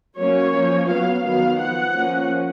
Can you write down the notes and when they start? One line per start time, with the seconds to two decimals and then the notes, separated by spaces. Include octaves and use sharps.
0.17 F#3 A#3 C#4 C#5
0.53 F3 A#3 C#4
0.88 F#3 B3 F5
1.24 D#3 F#3 B3 F5
1.59 F3 B3 F#5
1.96 F3 A#3 C#4